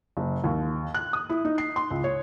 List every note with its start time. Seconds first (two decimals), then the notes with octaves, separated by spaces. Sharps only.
0.17 F#1
0.44 D#2
0.94 F#6
1.13 D#6
1.30 E4
1.45 D#4
1.58 C7
1.76 C6
1.91 C#2
2.04 C#5